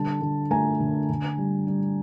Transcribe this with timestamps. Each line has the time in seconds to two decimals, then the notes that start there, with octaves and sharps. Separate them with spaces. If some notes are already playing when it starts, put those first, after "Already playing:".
Already playing: D3 G3 A5
0.21 D3
0.51 A3 G#5 A#5
0.80 D3
1.09 D3
1.38 G3
1.67 G3